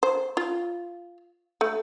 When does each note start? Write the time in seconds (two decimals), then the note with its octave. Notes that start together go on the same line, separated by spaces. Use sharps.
0.03 C5
0.37 F4
1.61 A3